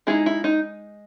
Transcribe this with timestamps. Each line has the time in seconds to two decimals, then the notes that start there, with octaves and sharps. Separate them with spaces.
0.07 G#3 D#4 E4 G#4
0.26 E4
0.44 D#4